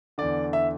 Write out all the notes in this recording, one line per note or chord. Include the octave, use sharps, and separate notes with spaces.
E2 D3 D5
E5